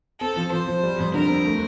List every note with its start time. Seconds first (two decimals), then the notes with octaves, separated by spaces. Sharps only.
0.21 C4 A4
0.37 F3
0.52 F3 C5
0.68 F3
0.83 G3
0.99 F2
1.14 D3 A#4
1.30 C4
1.45 A3